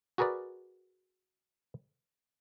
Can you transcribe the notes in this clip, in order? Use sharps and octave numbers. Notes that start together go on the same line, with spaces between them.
F#4 G#4 A#4 B4 D5